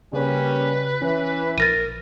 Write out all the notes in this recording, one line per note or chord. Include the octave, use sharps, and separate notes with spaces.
C#3 G3 A#3 C#4 B4
E3 C#4
A#1 A#4 A6 A#6 D#7